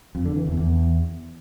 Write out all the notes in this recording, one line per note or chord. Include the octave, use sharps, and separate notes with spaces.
F2
D3
E3
E2
E2